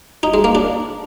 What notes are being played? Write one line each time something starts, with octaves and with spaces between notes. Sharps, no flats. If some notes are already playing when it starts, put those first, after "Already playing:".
D#4
G#3
A#3
D4